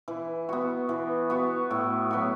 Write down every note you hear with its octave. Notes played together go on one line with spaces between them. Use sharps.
E3
B3 F#4
E3
B3 F#4
A2
F#3 B3 F#4